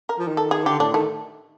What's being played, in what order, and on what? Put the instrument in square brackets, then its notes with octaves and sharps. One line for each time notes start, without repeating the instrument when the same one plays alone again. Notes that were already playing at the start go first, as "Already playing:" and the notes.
[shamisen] A#4
[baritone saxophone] F3
D#3
[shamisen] A4
G#4
[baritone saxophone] D3 [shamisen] G4
[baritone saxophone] A2 [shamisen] D4
[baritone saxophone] D#3 [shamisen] A3